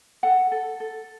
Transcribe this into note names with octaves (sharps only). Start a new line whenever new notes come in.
A4 F#5
A4
A4